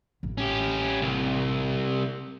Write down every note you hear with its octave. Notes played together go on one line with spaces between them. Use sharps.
A1
C#4 G4
C2